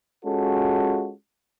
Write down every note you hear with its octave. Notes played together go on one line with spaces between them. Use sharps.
G#3 C#4 F4 F#4 A4